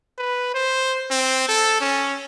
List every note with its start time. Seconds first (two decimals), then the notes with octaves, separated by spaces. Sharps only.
0.18 B4
0.54 C5
1.11 C4
1.49 A4
1.81 C#4